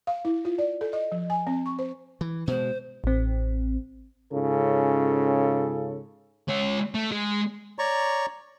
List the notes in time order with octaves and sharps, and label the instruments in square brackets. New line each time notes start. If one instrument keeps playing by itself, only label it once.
[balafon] F5
E4
F4
D5
A4
D#5
F3
G#5
C4
C#6
C5
[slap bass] E3
[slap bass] B2 G#3 [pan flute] C5
[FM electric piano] A1 C4
[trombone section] G#2 C#3 C#4 F4 A4
[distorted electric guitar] G#3 C#5
A3
G#3
[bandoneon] C#5 D5 A#5 C#6